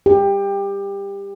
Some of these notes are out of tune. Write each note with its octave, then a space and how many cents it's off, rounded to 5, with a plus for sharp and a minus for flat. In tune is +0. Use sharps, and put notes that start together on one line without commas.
G4 +20